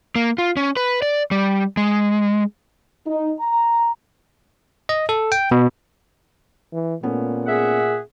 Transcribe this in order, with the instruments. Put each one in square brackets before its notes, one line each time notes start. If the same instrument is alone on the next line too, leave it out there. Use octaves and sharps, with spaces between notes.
[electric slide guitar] A#3
F4
C#4
B4
D5
G3
G#3
[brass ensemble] D#4
A#5
[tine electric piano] D#5
A4
G5
B2
[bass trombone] E3
[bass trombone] A#2 [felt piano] A3 B3 C#4
[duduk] G#4 [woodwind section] E5 F#5